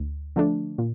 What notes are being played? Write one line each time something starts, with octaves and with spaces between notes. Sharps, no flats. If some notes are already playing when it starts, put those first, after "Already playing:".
Already playing: D2
D3 F3 A3 D4
A#2